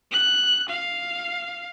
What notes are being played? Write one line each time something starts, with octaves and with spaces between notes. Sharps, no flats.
F#6
F5